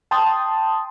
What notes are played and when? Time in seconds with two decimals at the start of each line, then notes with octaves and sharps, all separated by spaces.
0.11 G5 A5 C6 D#6